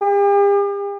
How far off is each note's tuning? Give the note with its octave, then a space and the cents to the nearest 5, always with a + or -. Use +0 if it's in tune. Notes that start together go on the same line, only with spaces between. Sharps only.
G4 +45